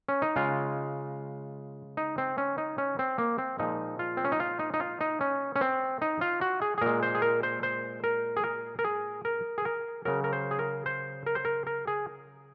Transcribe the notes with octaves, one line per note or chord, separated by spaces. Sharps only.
C#4
D#4
C#3 G#3 F4
D#4
C4
C#4
D#4
C#4
C4
A#3
C4
A#2 F3 G#3 D#4
F4
C4
C#4
D#4
F4
D#4
D#4
F4
D#4
C#4
C#4
C4
D#4
F4
F#4
G#4
G#4
A#2 G#3 A#4
C5
G#4
A#4
C5
C5
A#4
G#4
A#4
A#4
G#4
A#4
G#4
A#4
C#3 F#3 A#4
A#4
C5
G#4
A#4
C5
A#4
C5
A#4
A#4
G#4